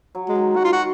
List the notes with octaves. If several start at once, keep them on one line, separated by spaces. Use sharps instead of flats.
F#3
G#3
D#3
F#4
F4
F#4